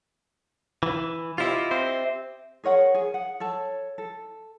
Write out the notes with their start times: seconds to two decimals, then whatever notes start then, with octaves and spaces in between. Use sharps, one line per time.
0.83 E3
1.38 E4 F4 G4 D#5 E5
1.71 C4 C5
2.64 G#4 A#4 C#5 F#5
2.94 G#4
3.14 F#5
3.40 A4 C#5 A5
3.98 A4